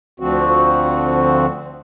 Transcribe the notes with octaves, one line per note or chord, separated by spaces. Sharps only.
D2 D3 F3 C4 F#4